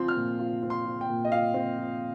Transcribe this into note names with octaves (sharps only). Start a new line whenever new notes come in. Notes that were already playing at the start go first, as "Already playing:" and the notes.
Already playing: F3 C4 F4 C6
F6
A#2
F4
C4
C6
F3
G5
A#2
D#5
F4 F5
C4
F3